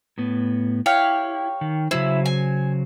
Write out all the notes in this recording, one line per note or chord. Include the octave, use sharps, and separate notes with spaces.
A2 B3
E4 G4 C#5 F5
D#3
C#3 F#3 E4 C5
G#5